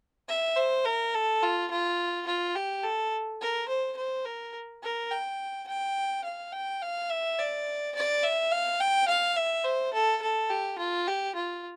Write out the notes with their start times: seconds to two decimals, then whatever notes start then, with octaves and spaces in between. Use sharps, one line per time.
0.29 E5
0.56 C5
0.85 A#4
1.14 A4
1.42 F4
1.71 F4
2.27 F4
2.56 G4
2.83 A4
3.41 A#4
3.68 C5
3.97 C5
4.25 A#4
4.83 A#4
5.12 G5
5.67 G5
6.24 F5
6.52 G5
6.82 F5
7.10 E5
7.39 D5
7.95 D5
8.23 E5
8.51 F5
8.80 G5
9.08 F5
9.36 E5
9.64 C5
9.93 A4
10.22 A4
10.50 G4
10.78 F4
11.07 G4
11.35 F4